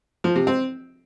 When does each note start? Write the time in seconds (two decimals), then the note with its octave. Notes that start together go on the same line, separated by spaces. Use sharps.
0.24 F3
0.36 C3
0.47 C4